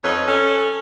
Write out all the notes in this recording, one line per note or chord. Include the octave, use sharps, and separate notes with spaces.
F2 D#4 B4 C#5
C#4 A4